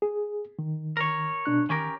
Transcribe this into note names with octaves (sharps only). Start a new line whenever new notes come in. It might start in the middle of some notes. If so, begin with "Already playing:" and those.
G#4
D#3
A#4 C#5
B2 D4 F#6
D#3 C#4 G4 A#4